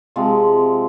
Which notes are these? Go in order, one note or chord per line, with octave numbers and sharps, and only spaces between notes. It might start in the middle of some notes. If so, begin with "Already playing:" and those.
C3 F3 G#3